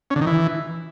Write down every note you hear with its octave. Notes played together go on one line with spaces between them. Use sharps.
C#4
D3
D#3
E3